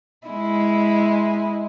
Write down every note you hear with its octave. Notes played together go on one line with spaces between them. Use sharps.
G#3 E4